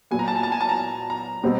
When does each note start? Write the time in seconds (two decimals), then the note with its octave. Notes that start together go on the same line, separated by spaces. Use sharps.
0.11 A#2 F#3 B3 G#5
0.19 A#5
0.28 A5
0.35 G#5
0.43 A5
0.52 G#5
0.61 A5
0.69 A#5
1.10 A#5
1.44 B2 G3 C4